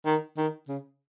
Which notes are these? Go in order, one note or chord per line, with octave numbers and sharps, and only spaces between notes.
D#3
D#3
C#3